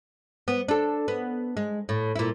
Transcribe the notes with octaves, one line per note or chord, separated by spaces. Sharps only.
B3
D4 A4
B3
G#3
A2
A#2 E4